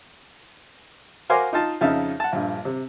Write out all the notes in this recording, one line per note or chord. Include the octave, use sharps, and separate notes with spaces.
F#4 A#4 C5 F5 G#5 D6
D#4 F4 A5
F2 C#3 D#4 E5 A5 F6
F#5 A5
A#1 G2
C3